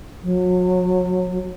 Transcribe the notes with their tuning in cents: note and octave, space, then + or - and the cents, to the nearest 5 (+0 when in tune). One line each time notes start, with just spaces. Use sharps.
F#3 -30